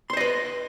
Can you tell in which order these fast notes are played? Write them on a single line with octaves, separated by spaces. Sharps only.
C6 C5 D#5 B4